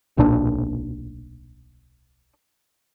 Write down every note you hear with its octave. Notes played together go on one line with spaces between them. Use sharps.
D1 B1 A#2 D4